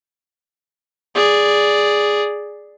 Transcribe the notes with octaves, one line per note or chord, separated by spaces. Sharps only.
G#4 D5